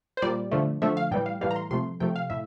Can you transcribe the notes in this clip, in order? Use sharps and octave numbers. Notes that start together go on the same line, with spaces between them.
C5
A#2 G3 D5
D3 F3 A3
D3 F3 A3 E5
F5
A2 E3 G3 G5
F5
A2 E3 G3 F5
A#5
C6
C3 F3 A3 C6
C3 F3 A3 G5
F5
A2 E5